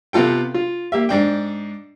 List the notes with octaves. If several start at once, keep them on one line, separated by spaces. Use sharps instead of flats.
C3 B3 F4 A4 G5
F4
A#3 G4 E5
G#2 D4 G5